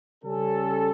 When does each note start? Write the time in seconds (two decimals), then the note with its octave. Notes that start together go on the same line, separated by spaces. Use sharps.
0.22 C#3 G3 C#4 A4